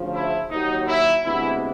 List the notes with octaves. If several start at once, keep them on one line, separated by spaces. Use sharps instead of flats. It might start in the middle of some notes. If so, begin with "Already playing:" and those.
Already playing: D2 C#3 F3
E4
D#2 D#3 F#3 D#4
E4
D2 C3 E3 G#3 B3 E4